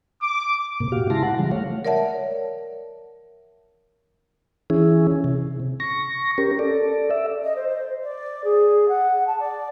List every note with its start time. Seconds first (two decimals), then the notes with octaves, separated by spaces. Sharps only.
0.22 D6
0.80 G#2 C3 A#3
0.92 A#2 F#4 G4 F5
1.10 C#3 G#3 E4 A5 C6 A#6
1.23 F#5
1.39 C#3 E3 F3 G3 G#3
1.51 A3 C#5 F5
1.85 A#4 C#5 D5 E5 F#5 A5
4.70 E3 C#4 E4 G#4
5.24 C3
5.80 C#6 A#6
6.38 C#4 G4 A#4
6.59 A4 D5
7.11 E5
7.43 D#5
7.55 C5
7.68 C5
8.02 D5
8.44 G#4
8.88 F#5
9.26 A5
9.39 D5